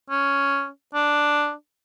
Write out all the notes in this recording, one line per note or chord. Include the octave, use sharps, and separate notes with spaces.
C#4
D4